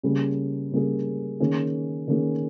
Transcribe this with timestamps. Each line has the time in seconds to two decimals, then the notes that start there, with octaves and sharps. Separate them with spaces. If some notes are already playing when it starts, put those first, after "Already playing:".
0.03 C#3 G3 A#3 C#4 G#4
0.72 C#3 G3 A#3 C#4 G#4
1.40 D#3 A#3 C#4 G#4
2.08 D#3 A#3 C#4 G#4